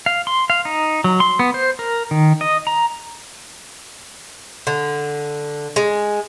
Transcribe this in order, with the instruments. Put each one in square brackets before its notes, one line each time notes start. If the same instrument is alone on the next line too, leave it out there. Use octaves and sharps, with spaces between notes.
[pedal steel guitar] F5
C6
F5
D#4
F#3
C6
B3
C5
A#4
D#3
D#5
A#5
[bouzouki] D3
G#3